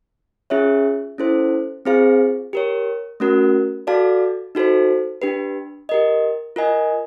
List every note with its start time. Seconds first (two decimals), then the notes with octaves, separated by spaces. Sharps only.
0.50 C#4 F4 G#4 C#5 E5
1.18 C#4 E4 A4 C5
1.85 C4 F4 G#4 C5 F5
2.53 G4 A#4 C#5
3.20 A3 C#4 F#4 A#4
3.87 F#4 A4 D5 F5 A5
4.55 D#4 F#4 A4 C5
5.22 D4 G4 B4
5.89 G4 A#4 D#5
6.56 F4 A#4 D#5 G#5